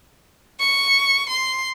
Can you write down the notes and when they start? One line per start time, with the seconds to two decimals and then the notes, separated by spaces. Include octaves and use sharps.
0.60 C#6
1.30 C6